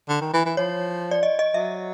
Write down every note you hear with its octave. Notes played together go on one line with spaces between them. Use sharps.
D3
D#3
E3
E3
F3 C#5
D5
D#5
D#5
F#3 E5